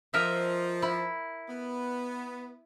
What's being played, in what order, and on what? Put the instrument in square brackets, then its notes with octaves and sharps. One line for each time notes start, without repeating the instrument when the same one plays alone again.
[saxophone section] F3 [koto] A#4 D#5 E5
[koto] E4
[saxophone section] B3